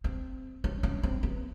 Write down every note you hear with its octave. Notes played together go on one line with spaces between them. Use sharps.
C4
C#4
C#4
C4
B3